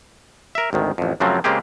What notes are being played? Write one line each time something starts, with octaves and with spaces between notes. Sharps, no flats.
A#4 E5
G#1 D2 D#3
A1 F2
F#2 C#3 F3 F#3 A3 C4
C#3 G#3 A#3 C4 G4 G#4